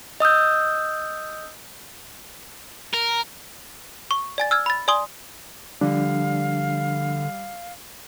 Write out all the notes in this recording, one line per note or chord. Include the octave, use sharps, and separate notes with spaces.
D#5 D#6 E6 G6
A#4
C#6
D5 G#5 A6
E6 F6 G#6
B5 A6
D5 G#5 C6 D#6 G7
D3 F3 G3 D4 F5